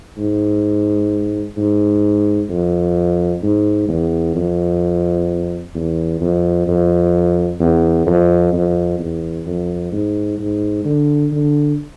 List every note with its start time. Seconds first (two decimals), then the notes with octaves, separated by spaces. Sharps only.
0.18 G#2
1.57 G#2
2.50 F2
3.43 G#2
3.88 E2
4.35 F2
5.75 E2
6.21 F2
6.68 F2
7.60 E2
8.06 F2
8.53 F2
8.99 E2
9.46 F2
9.92 G#2
10.39 G#2
10.85 D3
11.32 D3